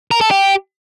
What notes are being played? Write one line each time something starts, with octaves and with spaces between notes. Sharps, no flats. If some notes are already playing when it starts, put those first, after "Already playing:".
A#4
A4
G4